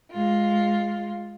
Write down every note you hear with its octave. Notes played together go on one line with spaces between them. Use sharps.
G#3 F4